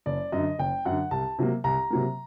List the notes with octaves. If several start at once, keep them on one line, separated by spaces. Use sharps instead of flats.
F#1 D5
F#2 D3 D#5
F#1 G5
F#2 D3 F#5
C2 A5
C3 F#3 A#3
C2 A#5
C3 F#3 A#3